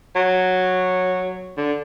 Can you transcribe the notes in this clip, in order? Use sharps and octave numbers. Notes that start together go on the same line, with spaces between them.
F#3
D3